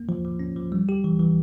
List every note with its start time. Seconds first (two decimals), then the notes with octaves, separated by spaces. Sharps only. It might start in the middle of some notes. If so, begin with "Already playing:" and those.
Already playing: A#3
0.09 F3
0.25 F3
0.39 C#4
0.56 F3
0.72 G3
0.89 G4
1.04 E3
1.20 E3